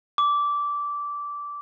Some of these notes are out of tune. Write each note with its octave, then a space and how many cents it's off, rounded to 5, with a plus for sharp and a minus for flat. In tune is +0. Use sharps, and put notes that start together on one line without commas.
D6 -15